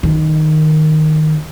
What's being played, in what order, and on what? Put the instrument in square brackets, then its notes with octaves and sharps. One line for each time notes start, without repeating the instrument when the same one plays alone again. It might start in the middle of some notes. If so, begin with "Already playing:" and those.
[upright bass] D#3